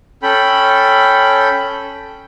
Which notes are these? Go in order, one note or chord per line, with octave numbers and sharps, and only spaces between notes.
C#4 A4 G5 B5